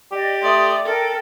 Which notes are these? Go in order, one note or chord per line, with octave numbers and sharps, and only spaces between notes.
G4 D5 D#5
A3 D5 C6 D#6
A4 A#4 G5